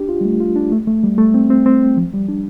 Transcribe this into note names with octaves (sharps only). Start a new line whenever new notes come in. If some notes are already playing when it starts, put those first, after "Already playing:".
Already playing: D4 G4
F4
G3
A3
F4
D4
A3
A3
G3
A3
C4
C4
C4
F3
G3
D4